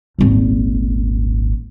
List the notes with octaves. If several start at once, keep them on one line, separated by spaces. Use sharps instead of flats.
D#1 G#1